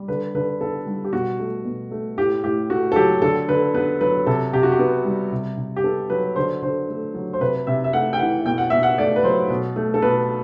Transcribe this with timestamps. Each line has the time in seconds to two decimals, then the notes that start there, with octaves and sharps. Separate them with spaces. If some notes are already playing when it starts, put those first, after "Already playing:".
Already playing: G3
0.08 D3 B4
0.35 D3 B4
0.60 B3 A4
0.87 G3
1.04 G4
1.13 B2 F#4
1.39 A3
1.65 B2
1.91 A3
2.18 A2 G4
2.44 A2 G4
2.70 A3 F#4
2.92 A4
2.96 F#3 G4
3.22 D3 A4
3.48 D3 B4
3.74 B3 B4
4.01 F#3 B4
4.26 C3 A4
4.53 C3 G4
4.63 F#4
4.72 G4
4.79 B3
5.05 G3
5.32 C3
5.57 C3
5.76 G4
5.84 B3 A4
6.10 F#3 B4
6.36 D3 C5
6.62 D3 C5
6.88 A3
7.14 F#3
7.33 C5
7.41 C3 B4
7.67 C3 E5
7.84 E5
7.93 A3 F#5
8.13 G5
8.19 E3 F#5
8.46 B2 G5
8.58 F#5
8.70 B2 E5
8.83 F#5
8.98 A3 D5
9.16 B4
9.24 F#3 C5
9.50 B2
9.76 A3
9.94 A4
10.02 B2 B4